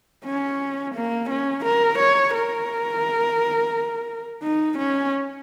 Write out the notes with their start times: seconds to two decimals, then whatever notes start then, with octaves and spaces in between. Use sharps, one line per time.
0.25 C#4
0.95 A#3
1.30 C#4
1.65 A#4
1.99 C#5
2.35 A#4
4.43 D#4
4.78 C#4